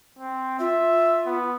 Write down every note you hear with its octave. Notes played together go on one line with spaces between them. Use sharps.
C4
F4 E5
B3